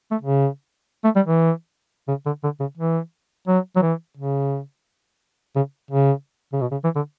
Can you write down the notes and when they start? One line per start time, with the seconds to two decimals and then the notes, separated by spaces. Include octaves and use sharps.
0.11 A3
0.22 C#3
1.04 A3
1.16 G3
1.26 E3
2.08 C#3
2.26 D3
2.43 D3
2.60 C#3
2.77 E3
3.48 F#3
3.76 F#3
3.82 E3
4.17 C#3
5.56 C#3
5.91 C#3
6.53 C#3
6.61 B2
6.71 C#3
6.84 E3
6.96 D3